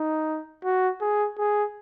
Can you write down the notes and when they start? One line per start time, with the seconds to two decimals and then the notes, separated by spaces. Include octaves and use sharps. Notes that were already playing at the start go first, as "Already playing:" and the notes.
Already playing: D#4
0.64 F#4
1.01 G#4
1.38 G#4